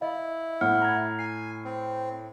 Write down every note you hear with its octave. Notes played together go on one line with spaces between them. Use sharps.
E4 D#5 F5
A2 F#5 F6
A#5 G#6
G#5 C7
C4